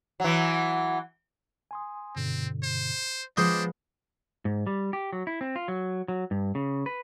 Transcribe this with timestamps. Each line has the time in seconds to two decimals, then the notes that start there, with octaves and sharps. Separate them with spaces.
0.20 E3 F#3
1.71 G#5 C6 D#6
2.16 G2 B2 D3 C4
2.64 C5
3.37 F3 G#3 B3 D4 C5 D#5 D6
4.45 G#2
4.67 G3
4.93 G4
5.13 F#3
5.27 E4
5.41 C4
5.56 F4
5.68 F#3
6.08 F#3
6.31 G2
6.55 C#3
6.86 B4